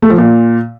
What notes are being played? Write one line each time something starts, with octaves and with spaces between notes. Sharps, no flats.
A3
F3
A#2